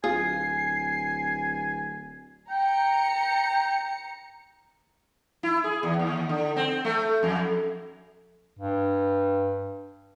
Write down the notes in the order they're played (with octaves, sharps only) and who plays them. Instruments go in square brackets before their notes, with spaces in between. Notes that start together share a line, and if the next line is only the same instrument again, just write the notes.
[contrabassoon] D1 [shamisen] F4 G#4 [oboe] G#5 [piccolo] C7
[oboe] G5 [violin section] A#5 C#7
[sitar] E4
G#4
E2
D#2
D3
C4
A3
F2
[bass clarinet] G2